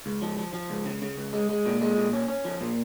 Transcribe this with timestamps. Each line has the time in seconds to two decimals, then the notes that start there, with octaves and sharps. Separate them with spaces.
0.06 C#2
0.22 F3
0.38 F3
0.53 F3
0.70 C#2
0.86 C#3
1.02 C#3
1.17 C#2
1.33 G#3
1.49 G#3
1.66 A#2
1.81 G#3
1.97 A#2
2.13 C#4
2.28 C#4
2.45 F3
2.61 A#2